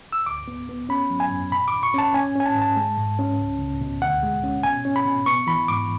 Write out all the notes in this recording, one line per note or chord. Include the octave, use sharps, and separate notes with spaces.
E6
D2 D6
B3
B3
C#4 B5
F#3
G#5
F#2
B2 B5
E2 D6
C#6
C#4 A5
C#4 G#5
C#4 G#5
A5
G#2
A5
G#3
G#2
C#4
C#2
C#2
B2
D2 F#5
G#3
C#4
B2 G#5
C#4
B5
B2
B3 C#6
E3 B5
G#2 D6